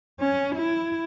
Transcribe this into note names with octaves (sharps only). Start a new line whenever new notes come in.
C#4
E4